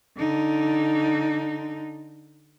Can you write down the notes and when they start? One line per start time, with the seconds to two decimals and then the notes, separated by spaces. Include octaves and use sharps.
0.18 D3 D#4